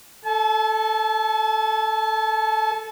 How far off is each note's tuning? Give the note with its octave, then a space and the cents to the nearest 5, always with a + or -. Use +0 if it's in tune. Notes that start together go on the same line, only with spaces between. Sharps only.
A4 +0 A5 -40